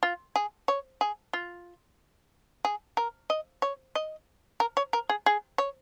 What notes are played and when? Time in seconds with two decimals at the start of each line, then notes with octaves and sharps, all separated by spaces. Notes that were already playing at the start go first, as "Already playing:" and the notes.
0.03 F4
0.36 G#4
0.68 C#5
1.01 G#4
1.33 F4
2.65 G#4
2.97 A#4
3.30 D#5
3.62 C#5
3.95 D#5
4.60 A#4
4.77 C#5
4.93 A#4
5.09 G#4
5.26 G#4
5.58 C#5